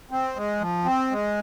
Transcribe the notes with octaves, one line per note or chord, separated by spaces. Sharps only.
C4
G#3
F3
C4
G#3